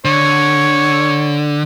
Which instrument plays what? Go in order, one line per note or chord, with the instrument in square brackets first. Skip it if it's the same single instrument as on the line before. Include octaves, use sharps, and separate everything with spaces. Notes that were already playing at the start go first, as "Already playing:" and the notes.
[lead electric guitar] D3 [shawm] C#5